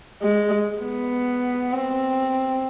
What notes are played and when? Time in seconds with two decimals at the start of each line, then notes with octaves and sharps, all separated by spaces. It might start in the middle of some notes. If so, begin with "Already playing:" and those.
0.22 G#3
0.83 B3
1.73 C4